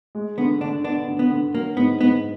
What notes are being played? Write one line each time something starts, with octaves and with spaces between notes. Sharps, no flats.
G#3
D3 B3
D3 D4
B3 D4
D3
B3
D3
F#3 A#3
G#2 B3
G#2 B3